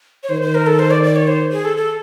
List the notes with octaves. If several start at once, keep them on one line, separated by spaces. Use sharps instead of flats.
C#5
D#3 C5
C5
A#4
A4
C5
D5
D5
C#5
C5
G#4
A4
A4